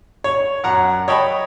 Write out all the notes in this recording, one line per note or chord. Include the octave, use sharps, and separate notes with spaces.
C#5
F#2 F#5 A#5 F#6
C#5 D#5 G5 A5 B5